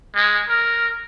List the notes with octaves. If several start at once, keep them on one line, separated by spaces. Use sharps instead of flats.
G#3
A#4